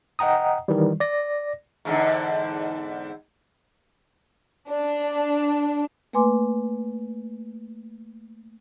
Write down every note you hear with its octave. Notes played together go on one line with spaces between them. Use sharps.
D#5 F#5 G5 A#5 D#6
D#3 E3 G3
D5 A#6
E2 G#2 D3
D4
A3 A#3 B4 G#5 C6 D6